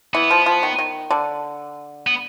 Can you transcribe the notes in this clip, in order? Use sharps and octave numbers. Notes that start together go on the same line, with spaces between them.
E3 B3
F3
F3
D#3
D#3
D3
B3